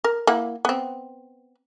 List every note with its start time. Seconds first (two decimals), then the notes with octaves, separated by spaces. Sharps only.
0.04 A#4
0.27 A#3 E4 F#5
0.65 B3 C4